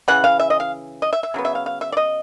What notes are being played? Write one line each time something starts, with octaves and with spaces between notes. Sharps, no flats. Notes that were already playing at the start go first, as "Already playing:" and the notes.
C#3 E3 F#5
F5
E5
D#5
F5
D#5
E5
E5
C#3 F#3 B3
E5
F5
F5
E5
D5
D#5